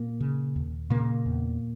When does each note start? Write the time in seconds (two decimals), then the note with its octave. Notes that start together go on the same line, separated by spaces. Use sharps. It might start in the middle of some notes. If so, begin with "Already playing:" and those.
Already playing: A#2 A#3
0.20 C#3
0.56 D#2
0.90 A#2 C#3 A#3
1.26 E2